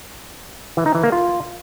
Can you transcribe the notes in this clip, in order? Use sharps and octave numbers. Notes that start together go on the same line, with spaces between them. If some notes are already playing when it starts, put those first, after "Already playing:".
E3
D#4
E3
A#3
F4